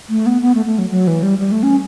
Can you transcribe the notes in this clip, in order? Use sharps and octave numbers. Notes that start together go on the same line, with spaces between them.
A3
B3
B3
A3
A3
F#3
F#3
E3
G3
G3
A3
C#4